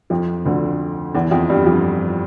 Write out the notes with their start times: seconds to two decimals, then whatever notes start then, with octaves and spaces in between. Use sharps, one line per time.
0.10 F2 F3
0.46 D2 D3
1.14 E2 E3
1.31 F2 F3
1.49 G2 G3
1.66 F2 F3